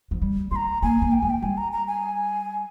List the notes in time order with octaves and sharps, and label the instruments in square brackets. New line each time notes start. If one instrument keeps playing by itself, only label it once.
[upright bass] F3
G3
[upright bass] G#3 [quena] A#5 C6
[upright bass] A#3 [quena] G#5
[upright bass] A#3
[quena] G5
[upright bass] G#3 [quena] G#5
[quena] G5
[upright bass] G3 [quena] G#5
[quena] A#5
A#5
G#5